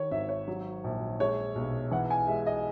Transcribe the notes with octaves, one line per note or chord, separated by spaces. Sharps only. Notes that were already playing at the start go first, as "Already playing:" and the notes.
Already playing: D#3 C#5
G#1 E5
C#5
F#3
A#1
G#3 C#5
B1
E3 F#5
G#5
G#3 E5
D#5